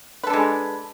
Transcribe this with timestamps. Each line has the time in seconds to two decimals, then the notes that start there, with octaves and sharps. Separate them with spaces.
0.24 B4
0.27 A4
0.30 D4
0.33 G#3